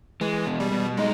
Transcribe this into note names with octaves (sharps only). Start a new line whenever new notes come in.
E3 G#3
B2
G3
B2
G#3 D#4